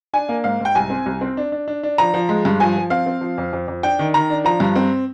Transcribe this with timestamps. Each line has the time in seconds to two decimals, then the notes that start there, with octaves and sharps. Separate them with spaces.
0.13 D4 G#5
0.29 A#3
0.44 G#2 F5
0.60 G#2
0.65 G5
0.75 C2 G#5
0.90 C4
1.06 C2
1.21 C4
1.37 D4
1.52 D4
1.68 D4
1.83 D4
1.98 F3 A#5
2.14 F3
2.29 G#3
2.45 G2
2.60 F3 G#5
2.76 F3
2.90 C4 F5
3.06 C4
3.21 F3
3.38 F2
3.53 F2
3.68 F2
3.83 D4 G5
3.99 D#3
4.14 D#3 A#5
4.30 D4
4.45 F3 A#5
4.60 G2
4.76 C4